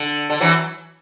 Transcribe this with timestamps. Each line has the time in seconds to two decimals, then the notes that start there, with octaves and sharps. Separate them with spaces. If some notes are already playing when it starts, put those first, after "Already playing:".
Already playing: D3
0.30 D3
0.40 E3 F#3